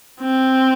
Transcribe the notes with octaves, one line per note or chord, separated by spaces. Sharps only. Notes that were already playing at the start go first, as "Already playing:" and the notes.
C4